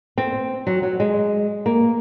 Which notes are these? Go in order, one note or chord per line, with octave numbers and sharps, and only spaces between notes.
C4
F#3
F#3
G#3
A#3